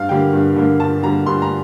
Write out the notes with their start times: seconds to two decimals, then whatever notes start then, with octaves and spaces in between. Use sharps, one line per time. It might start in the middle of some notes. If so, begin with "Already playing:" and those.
Already playing: G2 F5
0.09 D3 G3 A#3 G5
0.33 G2
0.56 D3 G3 A#3
0.80 G2 A5
1.03 D3 G3 A#3 A#5
1.26 G2 C6
1.42 A#5